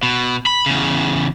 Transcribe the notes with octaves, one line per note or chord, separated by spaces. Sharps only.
B2
B5
E2 C#3